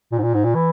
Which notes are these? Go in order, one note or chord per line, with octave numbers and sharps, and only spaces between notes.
A#2
G#2
A#2
G#2
A#2
E3